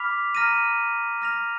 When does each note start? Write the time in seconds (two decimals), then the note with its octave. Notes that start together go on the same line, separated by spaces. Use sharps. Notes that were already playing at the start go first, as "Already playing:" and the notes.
Already playing: B5 D6 F6 B6 F7
0.35 A#5 F6 A#6 D#7
1.22 F6 A#6 F7